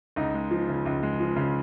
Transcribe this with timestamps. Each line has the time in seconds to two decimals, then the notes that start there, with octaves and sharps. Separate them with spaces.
0.16 C#2 D#4
0.34 G#3
0.51 F3
0.68 C#3
0.86 C#2
1.03 G#3
1.20 F3
1.36 C#3